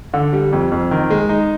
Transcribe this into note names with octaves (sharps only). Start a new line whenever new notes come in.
D3
G3
F2
F2
D#3
G#3
D#4